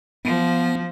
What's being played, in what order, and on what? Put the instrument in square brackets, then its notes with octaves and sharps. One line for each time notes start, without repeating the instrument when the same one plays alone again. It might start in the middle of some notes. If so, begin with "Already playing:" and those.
[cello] F3 [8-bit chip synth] B3